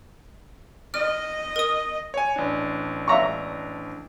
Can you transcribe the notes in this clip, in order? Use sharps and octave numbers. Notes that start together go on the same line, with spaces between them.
D#5 F6
A#4 D#6
C#5 G#5
A1 D4
E5 A#5 C#6